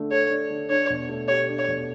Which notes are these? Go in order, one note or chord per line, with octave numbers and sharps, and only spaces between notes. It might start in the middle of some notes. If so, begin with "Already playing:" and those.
Already playing: D3 A3 D4
A4 C#5
D4
D3
D4 C#5
B2
A3
G4 C#5
D4
C#5
B2